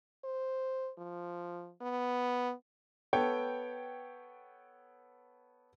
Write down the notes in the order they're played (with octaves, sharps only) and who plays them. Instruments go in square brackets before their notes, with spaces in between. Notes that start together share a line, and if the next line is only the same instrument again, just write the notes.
[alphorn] C5
F3
B3
[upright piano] B3 A4 C#5 G5